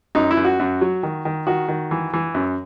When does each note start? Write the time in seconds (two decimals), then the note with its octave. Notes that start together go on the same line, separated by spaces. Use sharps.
0.15 F#2 D#4
0.31 E4
0.37 F#2
0.45 F#4
0.60 F#2
0.81 F#3
1.03 D#3
1.25 D#3
1.47 D#3 F#4
1.68 D#3
1.91 E3
2.13 E3
2.35 F#2